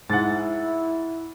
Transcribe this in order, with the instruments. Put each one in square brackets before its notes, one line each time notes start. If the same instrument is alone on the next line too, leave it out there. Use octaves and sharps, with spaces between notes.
[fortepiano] G#2 [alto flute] E4 [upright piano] F#5 A6